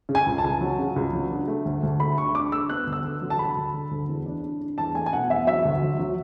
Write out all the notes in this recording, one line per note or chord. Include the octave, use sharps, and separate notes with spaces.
C#3
G#5
C#2
A5
C#2
F#3
C#3
C#2
F#3
D4
A3
D2
D2
A3 B5
D4 C#6
D4 D6
A3 E6
B3 F#6
D2
E6
D3
F#3
A5
D3 B5
D2
D3
D2
E2
D4
D4
D4
E2 A5
A3 G#5
G#5
B2 F#5
E2 E5
F#3 E5
D2
F#3
F#3